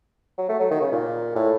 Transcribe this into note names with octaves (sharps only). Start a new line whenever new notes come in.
F#3
A3
F#3
D#3
C#3
A#2
A2